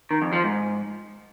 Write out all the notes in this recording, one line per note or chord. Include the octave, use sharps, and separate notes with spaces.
D#3
F2
F3
G#2